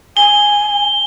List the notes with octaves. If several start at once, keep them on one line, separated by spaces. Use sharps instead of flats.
G#5 G7